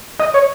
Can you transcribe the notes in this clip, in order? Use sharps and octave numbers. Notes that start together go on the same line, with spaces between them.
D#5
C#5